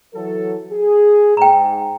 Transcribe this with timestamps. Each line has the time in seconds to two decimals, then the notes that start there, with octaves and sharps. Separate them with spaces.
0.15 E3 F#3 A4
0.72 G#4
1.37 G#2 G5 A#5